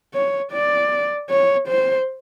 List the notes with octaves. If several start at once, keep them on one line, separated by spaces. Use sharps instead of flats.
C#5
D5
C#5
C5